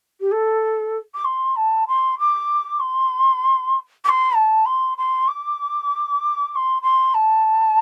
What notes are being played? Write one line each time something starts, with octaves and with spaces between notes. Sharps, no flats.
G4
A4
D6
C6
A5
C6
D6
C6
D6
C6
A5
C6
C6
D6
D6
C6
C6
A5